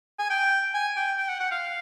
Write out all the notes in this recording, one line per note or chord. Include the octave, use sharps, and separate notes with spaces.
G#5
G5
G#5
G5
G5
F#5
F#5
F5